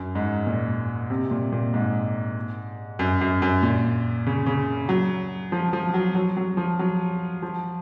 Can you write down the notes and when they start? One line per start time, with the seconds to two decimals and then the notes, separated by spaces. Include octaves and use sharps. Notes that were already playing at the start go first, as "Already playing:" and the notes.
Already playing: F#2
0.15 G#2
0.46 A#2
1.10 C3
1.31 A#2
1.52 A#2
1.74 G#2
2.99 F#2
3.21 F#2
3.42 F#2
3.63 A#2
4.26 C#3
4.46 C#3
4.89 F#3
5.52 F3
5.73 F3
5.94 F#3
6.15 F#3
6.37 F#3
6.57 F3
6.79 F#3
7.43 F3